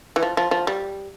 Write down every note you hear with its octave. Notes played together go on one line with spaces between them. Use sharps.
E3
F3
F3
F3
G3